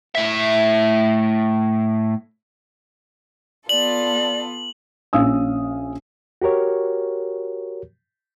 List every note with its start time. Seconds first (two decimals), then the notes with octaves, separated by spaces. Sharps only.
0.15 A2 E5
3.69 B3 F4 A4 D5 F#7
5.13 A#1 C#4 F5 D#6 E6
6.42 F#4 G4 A#4 C#5